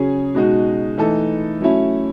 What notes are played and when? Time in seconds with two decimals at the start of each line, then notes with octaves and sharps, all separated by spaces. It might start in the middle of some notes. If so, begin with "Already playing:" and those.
Already playing: C#3 F#3 C#4 G#4
0.34 B2 G#3 D#4 F#4
0.98 E3 A3 D#4 A4
1.60 F#3 A3 C#4 E4